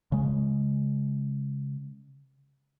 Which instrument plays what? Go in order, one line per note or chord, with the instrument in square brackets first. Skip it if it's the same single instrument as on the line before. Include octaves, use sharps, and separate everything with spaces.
[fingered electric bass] C#3 G#3